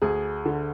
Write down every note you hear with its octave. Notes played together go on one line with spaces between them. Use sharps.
D2 G#4
D3